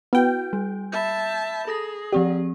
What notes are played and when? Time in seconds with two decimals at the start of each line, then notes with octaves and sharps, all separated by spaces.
0.13 B3 E4 F#4 G5
0.53 G3
0.92 E5 A5 B5 G6
1.67 G#4 A4 D#6 A#6
2.12 F3 C4 G4 D5